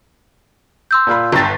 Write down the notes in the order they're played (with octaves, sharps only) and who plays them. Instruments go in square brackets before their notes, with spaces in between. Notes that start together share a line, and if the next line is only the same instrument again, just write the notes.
[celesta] C6 E6 G6
[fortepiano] A#2 F4 B5
[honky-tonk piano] G1 A6 [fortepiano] G5 A5 A#5